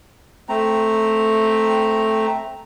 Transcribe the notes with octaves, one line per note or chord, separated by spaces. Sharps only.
A3 C4 A#5